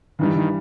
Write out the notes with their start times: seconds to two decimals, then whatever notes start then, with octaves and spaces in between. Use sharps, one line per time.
0.19 G2 D#3 E3 G3
0.36 D#3